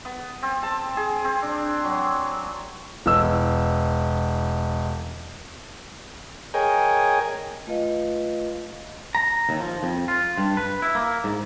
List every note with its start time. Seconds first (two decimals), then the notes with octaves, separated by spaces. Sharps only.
0.05 B3
0.43 C4
0.63 A5
0.97 G#4
1.24 C4
1.42 D4
1.85 F#3
3.06 E1 E6
6.54 G#4 A#4 C#5 D#5 G5 G#5
7.67 A3 F4 B4 D#5 F5
9.15 A#5
9.49 D#2
9.60 F3
9.83 F2
10.08 F4
10.38 G2
10.57 B4
10.82 E4
10.95 A#3
11.24 G#2